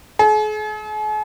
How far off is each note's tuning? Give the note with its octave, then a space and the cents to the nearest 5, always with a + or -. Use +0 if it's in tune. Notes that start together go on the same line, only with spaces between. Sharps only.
G#4 +45